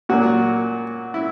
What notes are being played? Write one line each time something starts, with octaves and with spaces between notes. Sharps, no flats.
A#2 F#3 A#3 F#4
E4